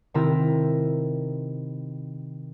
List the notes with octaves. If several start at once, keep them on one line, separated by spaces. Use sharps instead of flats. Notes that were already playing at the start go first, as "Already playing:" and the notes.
C3 D#3 C4 E4 E5 A#5